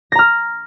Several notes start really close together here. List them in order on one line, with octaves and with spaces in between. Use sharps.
A#6 A#5 F6